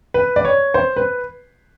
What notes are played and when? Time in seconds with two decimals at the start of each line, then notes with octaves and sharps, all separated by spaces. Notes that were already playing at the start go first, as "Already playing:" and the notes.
0.14 B4
0.36 D5
0.45 C#5
0.74 C5
0.97 B4